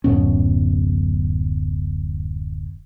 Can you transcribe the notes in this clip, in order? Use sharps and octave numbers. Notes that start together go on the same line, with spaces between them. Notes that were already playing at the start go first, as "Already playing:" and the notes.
D1 F#2 B2 C#4